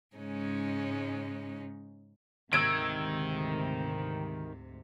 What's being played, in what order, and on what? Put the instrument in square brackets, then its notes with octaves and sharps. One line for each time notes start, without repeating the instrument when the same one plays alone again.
[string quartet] G#2 C#3 G#3 C#4 D#4
[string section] D2 G#2 C3 [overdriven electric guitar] D#3 [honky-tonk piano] E6 G#6 D7